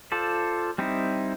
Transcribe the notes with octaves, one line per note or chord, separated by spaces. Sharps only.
F4 A4 C5 D5
G3 C4 D#4 E4